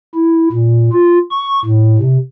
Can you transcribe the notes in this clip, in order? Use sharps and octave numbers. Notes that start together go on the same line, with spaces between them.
E4
A#2
F4
C#6
A2
C3